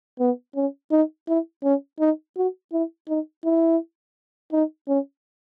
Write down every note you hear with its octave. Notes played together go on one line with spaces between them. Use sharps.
B3
C#4
D#4
E4
C#4
D#4
F#4
E4
D#4
E4
D#4
C#4